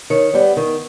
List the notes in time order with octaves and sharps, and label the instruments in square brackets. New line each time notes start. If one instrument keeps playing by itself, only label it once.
[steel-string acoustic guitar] D#3 [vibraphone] C#5
[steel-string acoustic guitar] G3 B3
D#3